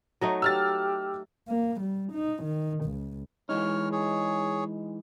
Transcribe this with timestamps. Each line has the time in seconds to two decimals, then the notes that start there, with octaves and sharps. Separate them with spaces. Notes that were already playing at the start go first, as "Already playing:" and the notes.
0.21 F#3 A3 D#4
0.42 G4 E6 F6 A6
1.49 A#3
1.81 G3
2.13 D#4
2.43 D#3
2.85 C#2
3.49 E3 G#3 D#4 C#5 F6
3.92 G#4 C#5